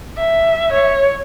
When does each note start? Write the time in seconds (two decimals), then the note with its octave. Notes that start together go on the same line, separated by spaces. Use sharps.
0.18 E5
0.70 C#5